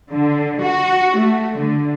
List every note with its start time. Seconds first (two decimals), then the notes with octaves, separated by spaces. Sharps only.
0.11 D3
0.62 F#4
1.17 A3
1.58 D3